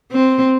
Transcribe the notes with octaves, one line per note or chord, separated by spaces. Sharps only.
C4